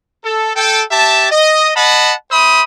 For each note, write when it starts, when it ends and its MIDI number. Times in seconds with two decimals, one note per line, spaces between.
0.24 0.51 69
0.56 0.82 69
0.56 0.82 79
0.91 1.29 67
0.91 1.29 76
0.91 1.29 81
1.31 1.69 75
1.75 2.12 75
1.75 2.12 78
1.75 2.12 81
1.75 2.12 83
2.31 2.62 72
2.31 2.62 76
2.31 2.62 83
2.31 2.62 87